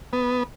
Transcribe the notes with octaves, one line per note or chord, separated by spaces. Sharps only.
B3